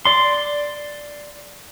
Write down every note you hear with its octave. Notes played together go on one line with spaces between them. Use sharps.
D5 C6